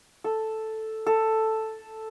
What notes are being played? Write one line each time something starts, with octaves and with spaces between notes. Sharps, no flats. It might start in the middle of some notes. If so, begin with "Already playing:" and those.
A4
A4